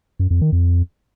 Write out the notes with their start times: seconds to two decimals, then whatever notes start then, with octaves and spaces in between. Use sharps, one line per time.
0.19 F#2
0.30 F2
0.41 D#3
0.52 F2